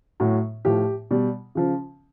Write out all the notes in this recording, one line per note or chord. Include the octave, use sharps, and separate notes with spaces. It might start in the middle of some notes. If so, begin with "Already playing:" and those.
A2 F#3
A2 F3 G4
B2 G3
C#3 F3